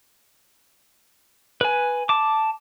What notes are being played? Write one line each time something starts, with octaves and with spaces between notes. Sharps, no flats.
B4 G#5
A5 D6